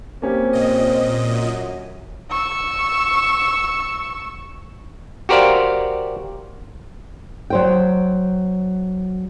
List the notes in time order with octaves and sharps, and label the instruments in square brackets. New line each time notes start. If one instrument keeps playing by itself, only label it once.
[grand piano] A#3 C#4 G4 [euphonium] C4
[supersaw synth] A#2 D#5
[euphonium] F#2
[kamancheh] C#6 E6
[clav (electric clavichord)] F#4 G4 A#4 C5 D5 F5
[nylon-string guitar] F#3 C5 G5